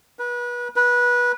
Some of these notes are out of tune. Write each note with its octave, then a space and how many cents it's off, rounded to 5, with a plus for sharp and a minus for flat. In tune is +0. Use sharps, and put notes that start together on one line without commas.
B4 -30
B4 -20